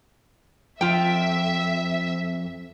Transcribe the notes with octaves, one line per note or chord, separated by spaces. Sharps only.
F2 F4 E5 G5